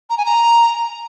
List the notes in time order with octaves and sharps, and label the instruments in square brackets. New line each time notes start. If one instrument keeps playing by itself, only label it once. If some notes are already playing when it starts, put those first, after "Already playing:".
[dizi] A#5
G#5
A#5